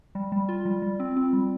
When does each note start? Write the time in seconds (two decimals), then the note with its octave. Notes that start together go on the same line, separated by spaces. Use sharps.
0.15 G3
0.32 G3
0.49 F4
0.65 G3
0.82 G3
1.00 C4
1.16 C4
1.33 G3